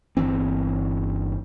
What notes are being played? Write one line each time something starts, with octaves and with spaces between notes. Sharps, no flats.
G1 E3 C4